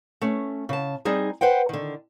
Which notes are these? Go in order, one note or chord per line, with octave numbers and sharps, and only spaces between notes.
A3 C#4
C#3 A5
G3 C4 D#4 G#4
B4 C5 F#5 G5
D3 D#3